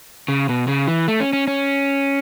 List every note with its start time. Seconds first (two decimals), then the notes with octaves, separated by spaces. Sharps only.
0.28 C#3
0.49 B2
0.68 C#3
0.88 E3
1.08 A3
1.20 C#4
1.33 C#4
1.47 C#4